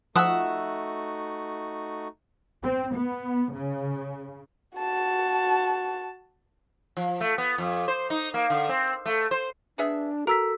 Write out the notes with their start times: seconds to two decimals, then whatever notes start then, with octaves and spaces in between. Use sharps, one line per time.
0.16 F3 A3 D#4 F#4 E5 F#5 D#6 E6
2.62 C4
2.95 B3
3.53 C#3
4.78 F#4 A5
6.97 F3
7.21 A3
7.38 B3
7.58 F2
7.88 C5
8.10 D#4
8.34 A#3
8.50 D3
8.69 C4
9.06 A3
9.31 C5
9.78 B3 D4 G#4 E5
10.27 F#4 A4 A#4 E6 B6